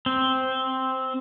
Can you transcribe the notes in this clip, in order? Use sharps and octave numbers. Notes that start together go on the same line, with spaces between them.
C4